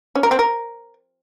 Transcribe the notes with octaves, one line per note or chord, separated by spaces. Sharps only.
C#4
A#4
C4
A#4